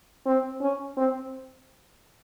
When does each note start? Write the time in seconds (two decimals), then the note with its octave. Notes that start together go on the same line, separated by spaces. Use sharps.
0.26 C4
0.61 C#4
0.97 C4